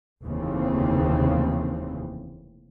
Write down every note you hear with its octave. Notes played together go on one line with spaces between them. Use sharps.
F1 D#2 C#3 E3 C4